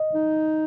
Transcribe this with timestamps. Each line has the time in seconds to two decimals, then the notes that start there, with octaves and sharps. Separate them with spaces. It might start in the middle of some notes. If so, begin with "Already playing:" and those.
Already playing: D#5
0.15 D#4